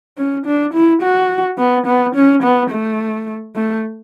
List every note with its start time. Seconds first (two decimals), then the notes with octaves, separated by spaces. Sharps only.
0.18 C#4
0.46 D4
0.73 E4
1.02 F#4
1.58 B3
1.87 B3
2.15 C#4
2.43 B3
2.71 A3
3.55 A3